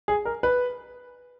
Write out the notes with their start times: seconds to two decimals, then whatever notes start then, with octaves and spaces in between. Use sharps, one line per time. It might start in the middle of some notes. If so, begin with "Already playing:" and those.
0.08 G#4
0.25 A#4
0.43 B4